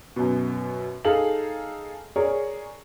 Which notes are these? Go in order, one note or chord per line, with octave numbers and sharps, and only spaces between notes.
F#2 B2
D#4 G#4 A4 F5 F#7
G#4 A#4 C#5 D5